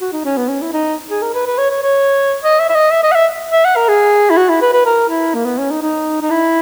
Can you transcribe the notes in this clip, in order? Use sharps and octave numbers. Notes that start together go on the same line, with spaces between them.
F#4
D#4
C#4
B3
C#4
E4
D#4
G#4
A#4
B4
B4
C#5
C#5
C#5
D#5
E5
E5
D#5
E5
D#5
F#5
E5
E5
F#5
A#4
G#4
E4
F#4
E4
B4
B4
A#4
E4
A#3
B3
C#4
D#4
D#4
D#4
E4